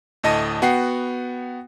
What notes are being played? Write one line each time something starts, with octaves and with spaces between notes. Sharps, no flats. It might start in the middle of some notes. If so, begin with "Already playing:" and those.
D2 A2 D#5 A5 A#6 D#7
B3 F#4 F#5 G5 C7